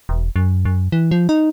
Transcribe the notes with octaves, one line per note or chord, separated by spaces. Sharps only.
E1
F#2
F#2
E3
F3
D#4